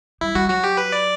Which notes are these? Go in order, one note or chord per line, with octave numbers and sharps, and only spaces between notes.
G3 E4
G3 F#4
F#3 F#4
G4
B4
D5